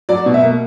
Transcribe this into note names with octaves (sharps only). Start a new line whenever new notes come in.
F#3 D5
B2
E5
A#3